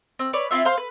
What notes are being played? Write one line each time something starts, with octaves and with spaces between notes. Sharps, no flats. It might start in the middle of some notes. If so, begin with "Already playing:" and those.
C4
B4 C#5 D5
C4 E4 F4 E5
C5 F5 C6
B4